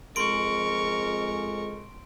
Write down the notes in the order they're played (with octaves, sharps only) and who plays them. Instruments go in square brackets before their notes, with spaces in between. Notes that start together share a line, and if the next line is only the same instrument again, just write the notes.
[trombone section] F2 G#3 [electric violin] A#4 C#6 [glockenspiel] C6 D7